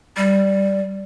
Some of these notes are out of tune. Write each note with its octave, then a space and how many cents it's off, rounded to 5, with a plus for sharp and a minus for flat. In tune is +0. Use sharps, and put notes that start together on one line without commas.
G3 -5